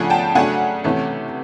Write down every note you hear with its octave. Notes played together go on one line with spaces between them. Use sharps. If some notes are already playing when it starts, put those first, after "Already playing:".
Already playing: C#3 F3 A3 D4 F#5 G#5
G5 A5
C#3 F#3 A3 D4 F#5 G#5
C3 E3 A3 C#4